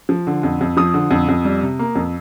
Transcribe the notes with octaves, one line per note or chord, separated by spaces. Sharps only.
F3
D3
F2
F2
F3 D#6
D3
F2
F2
G3
C3
A#3
F2